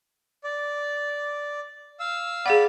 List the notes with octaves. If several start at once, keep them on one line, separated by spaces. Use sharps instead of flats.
D5
F5 E6
G#4 D5 F5 F#5 B5